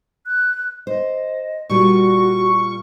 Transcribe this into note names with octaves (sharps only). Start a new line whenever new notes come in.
F#6
C5 D#5
A#2 G3 F4 F#4 C#6